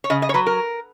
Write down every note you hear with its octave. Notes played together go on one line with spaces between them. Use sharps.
C#5
C#3 D#5
D#5
C#5
F#3 B4
A#4